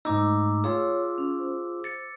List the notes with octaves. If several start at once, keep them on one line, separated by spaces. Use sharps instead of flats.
G#2 A3 D#4 D6 E6
F4 G#4 C#5 E6
C#4
C5
A6 C#7